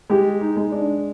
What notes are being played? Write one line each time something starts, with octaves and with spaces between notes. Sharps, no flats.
G#3 G4
D#4
G#3
D4